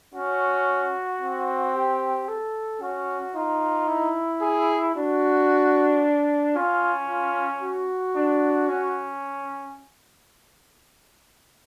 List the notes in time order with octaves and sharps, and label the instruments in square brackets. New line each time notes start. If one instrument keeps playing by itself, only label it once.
[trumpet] C#4 [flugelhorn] F#4
[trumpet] C4
[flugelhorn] G4
A4
[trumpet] C#4 [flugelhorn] F#4
[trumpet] D#4 [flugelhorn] F4
[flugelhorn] E4
[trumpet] G#4
[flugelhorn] D4 [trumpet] F#4
[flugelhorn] C#4 [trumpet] F4
[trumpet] F4
F#4
[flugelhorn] D4
C#4